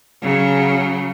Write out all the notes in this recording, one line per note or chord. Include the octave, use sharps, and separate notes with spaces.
C#3 F#3